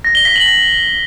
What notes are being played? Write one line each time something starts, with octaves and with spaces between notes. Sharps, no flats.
A#6
G7
B6
F#7
A#6